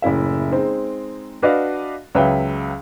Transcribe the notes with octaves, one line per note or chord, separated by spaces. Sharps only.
F#1 A2 E4 E5
G#3 C4 D#4
D4 F#4 B4 D5 D#5 F5
C#2 F#3 B4 E5 G5